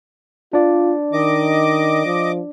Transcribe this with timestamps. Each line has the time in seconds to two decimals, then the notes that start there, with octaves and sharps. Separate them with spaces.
0.53 D4 F4 D5
1.13 D#3 D#5 D6
2.06 F3